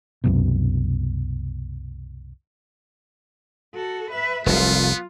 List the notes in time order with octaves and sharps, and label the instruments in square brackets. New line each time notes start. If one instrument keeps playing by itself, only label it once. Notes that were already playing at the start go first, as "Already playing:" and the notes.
[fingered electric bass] C2 F#2 B2
[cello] F#4 A4
B4 E5
[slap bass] F1 C2 [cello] F#3 F4 [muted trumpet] B3